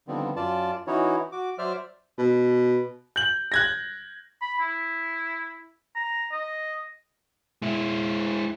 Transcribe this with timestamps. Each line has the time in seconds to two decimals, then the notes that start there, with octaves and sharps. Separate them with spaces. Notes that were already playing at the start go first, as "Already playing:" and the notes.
0.08 D3 D#3 F3 G3 B3 C4
0.36 F#2 F4 D5 A5
0.87 E3 C#4 D#4 E4 F#4 C#5
1.32 F#4 D6
1.59 F#3 C5 D5 E5 F6
2.18 B2
3.16 G6 F#7
3.52 F#6 G#6 A#6
4.42 B5
4.60 E4
5.96 A#5
6.32 D#5
7.62 G#3 E4